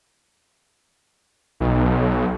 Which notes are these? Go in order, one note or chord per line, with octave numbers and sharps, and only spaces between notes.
B1